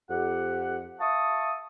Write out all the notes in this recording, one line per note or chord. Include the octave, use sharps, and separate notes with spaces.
F2 G4 F#5
E5 F5 A5 C#6 D#6